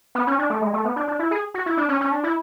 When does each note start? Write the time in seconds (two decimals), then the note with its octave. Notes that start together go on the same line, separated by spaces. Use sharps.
0.15 B3
0.27 C#4
0.39 D4
0.50 A3
0.62 G#3
0.74 A3
0.85 B3
0.96 D4
1.08 D4
1.19 E4
1.31 G#4
1.54 F#4
1.66 E4
1.77 D4
1.89 C#4
2.01 C#4
2.12 D4
2.23 E4